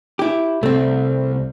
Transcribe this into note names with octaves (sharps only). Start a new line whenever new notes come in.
E4 G4
C2 A3 C4